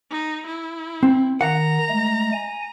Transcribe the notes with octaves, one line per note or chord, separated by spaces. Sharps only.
D#4
E4
C4
D#3 F#5 A#5
G#3 A3
G#5